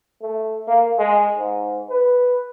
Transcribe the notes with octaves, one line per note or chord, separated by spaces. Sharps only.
A3
A#3
G#3
G#2
B4